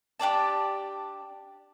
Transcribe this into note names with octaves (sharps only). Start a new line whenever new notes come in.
D4 G4 D5 A5